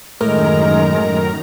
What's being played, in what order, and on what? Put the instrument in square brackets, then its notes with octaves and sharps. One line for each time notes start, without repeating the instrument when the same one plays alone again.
[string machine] F#2 D#3 A#5 [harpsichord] A2 [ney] G#3 [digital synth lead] A#4